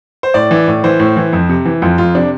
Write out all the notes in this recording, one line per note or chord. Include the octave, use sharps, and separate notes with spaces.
C5
A2 D5
E3
A2
E3 C5
A2
E3
F2
C3
E3
F2 F4
F2 F4
C3 D4